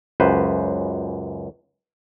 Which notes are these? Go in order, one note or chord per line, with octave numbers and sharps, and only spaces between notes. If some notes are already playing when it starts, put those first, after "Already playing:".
C#2 F#2 B4 C5